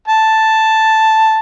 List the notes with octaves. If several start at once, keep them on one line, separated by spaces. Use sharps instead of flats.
A5